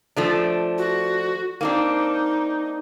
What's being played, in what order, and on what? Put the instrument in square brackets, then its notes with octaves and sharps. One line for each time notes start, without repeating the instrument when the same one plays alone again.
[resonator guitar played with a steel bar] F3 A3 D4
[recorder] F#4
[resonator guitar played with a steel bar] A#3 C4 D4 [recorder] D#4